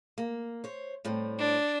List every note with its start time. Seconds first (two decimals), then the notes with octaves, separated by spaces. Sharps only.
0.18 A#3
0.64 C5 C#5
1.05 A2 G3 C4
1.38 D4